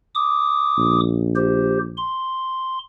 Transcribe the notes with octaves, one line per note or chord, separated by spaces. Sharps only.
D6 D#6
A#1
G4 C5
C6